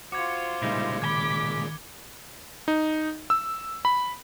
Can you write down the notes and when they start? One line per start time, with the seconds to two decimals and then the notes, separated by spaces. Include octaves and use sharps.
0.12 F4 F#4 C5 D6 G#6 C#7
0.62 A#2 C#3 G3 G#3 D#4 E4
1.02 D#3 G#5 B5 D6 G#6 B6 G7
2.68 D#4
3.30 E6
3.85 B5